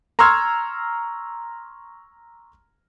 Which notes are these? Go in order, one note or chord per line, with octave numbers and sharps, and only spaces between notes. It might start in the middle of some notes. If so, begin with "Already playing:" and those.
A#5 C6 C#6 E6 F6 G#6